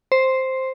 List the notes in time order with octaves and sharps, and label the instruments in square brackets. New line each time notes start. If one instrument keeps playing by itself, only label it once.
[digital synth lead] C5